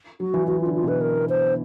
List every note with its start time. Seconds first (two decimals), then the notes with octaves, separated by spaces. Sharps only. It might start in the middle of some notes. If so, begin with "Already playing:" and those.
0.20 F#3 F#4
0.34 E3
0.47 E3 F#4
0.61 D3 F4
0.74 F4
0.83 B2 B4
1.01 A#4
1.29 C5